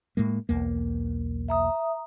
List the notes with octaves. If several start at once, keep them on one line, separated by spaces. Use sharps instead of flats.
A2 G#3 A#3
B1 E2 A#3
E5 A#5 D#6